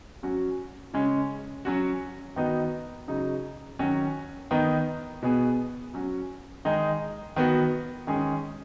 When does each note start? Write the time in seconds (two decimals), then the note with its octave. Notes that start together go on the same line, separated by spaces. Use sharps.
0.23 F#3 C#4 F#4
0.94 C#3 G#3 C#4
1.65 F#3 C#4 F#4
2.36 D#3 B3 D#4 F#4
3.08 C#3 F#3 D#4
3.79 D#3 F#3 C#4 F#4
4.51 D#3 B3 D#4
5.23 B2 B3 G#4
5.94 F#3 C#4 F#4
6.65 D#3 G#3 D#4 G#4
7.36 D#3 B3 F#4
8.07 D#3 G#3 C#4 G#4